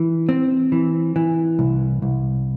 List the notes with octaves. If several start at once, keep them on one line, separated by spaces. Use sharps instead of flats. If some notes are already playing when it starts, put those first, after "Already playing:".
Already playing: E3
C4
E3
E3
C2
C2